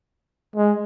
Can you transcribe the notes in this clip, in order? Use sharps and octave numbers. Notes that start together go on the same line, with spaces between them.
G#3